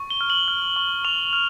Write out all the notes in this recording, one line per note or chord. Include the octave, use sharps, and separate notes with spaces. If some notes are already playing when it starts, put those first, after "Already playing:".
Already playing: C#6
G7
F6
F#7
F6
C#6
C#6 F7
F6